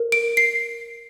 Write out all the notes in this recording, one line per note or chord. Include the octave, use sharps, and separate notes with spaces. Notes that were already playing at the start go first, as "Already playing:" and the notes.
Already playing: A#4
D7
C7